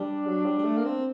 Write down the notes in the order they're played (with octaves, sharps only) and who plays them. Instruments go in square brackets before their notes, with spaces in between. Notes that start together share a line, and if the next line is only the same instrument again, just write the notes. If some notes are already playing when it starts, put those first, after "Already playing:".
Already playing: [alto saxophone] G3 [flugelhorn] D4
[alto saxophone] F#3
G3
G3
A3
A#3
C4